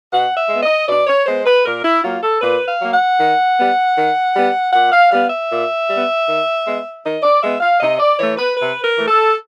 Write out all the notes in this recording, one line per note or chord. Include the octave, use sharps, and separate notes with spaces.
B2 F#5
E5
G#3 B3
D#5
B2 D5
C#5
G#3 B3 C5
B4
A#2 A#4
E4
F#3 A#3 F4
A4
A#2 B4
F5
F#3 A#3
F#5
D#3
G3 B3
D#3
G3 B3
A#2 F#5
F5
G3 B3 F5
E5
A#2
G3
B3
D#3
G#3 B3
D#3 D#5
D5
G#3 B3 E5
F5
C3 D#5
D5
E3 A3 C#5
B4
C3 B4
A#4
E3 A3
A4